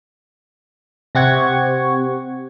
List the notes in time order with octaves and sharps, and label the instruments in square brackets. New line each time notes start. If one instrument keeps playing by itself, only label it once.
[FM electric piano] C3 C4 G4 F#5 C#6 G#6